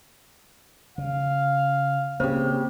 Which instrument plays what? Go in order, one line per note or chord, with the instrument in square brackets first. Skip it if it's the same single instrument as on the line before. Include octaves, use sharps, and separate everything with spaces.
[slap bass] C#3 [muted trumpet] F5
[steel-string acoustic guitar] C#3 G4 [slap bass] A#3 C4 [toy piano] C5